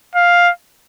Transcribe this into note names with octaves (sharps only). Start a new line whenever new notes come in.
F5